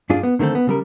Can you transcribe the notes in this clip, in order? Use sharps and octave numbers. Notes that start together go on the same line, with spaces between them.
G2 D4 F4 G#4
B3
D3 D#3 A3 C4 A4
B3
C#3 G3 A#4